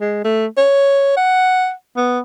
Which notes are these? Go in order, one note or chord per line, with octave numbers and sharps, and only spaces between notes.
G#3
A3
C#5
F#5
B3